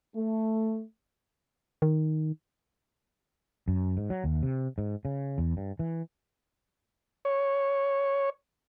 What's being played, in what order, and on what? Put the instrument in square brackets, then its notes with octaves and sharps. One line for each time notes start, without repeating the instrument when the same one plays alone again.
[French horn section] A3
[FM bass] D#3
[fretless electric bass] F#2
G#2
F#3
D#2
C3
G#2
C#3
E2
G2
E3
[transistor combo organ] C#5